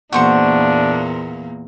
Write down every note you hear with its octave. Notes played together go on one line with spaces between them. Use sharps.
E2 A#2 A#3 D4 F#4 C5 C#6